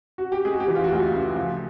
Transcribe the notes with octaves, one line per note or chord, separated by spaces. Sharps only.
F#4
G4
G#3 G#4
F#4
G4
E3
F4
F#4
D2 F4
C#3
F3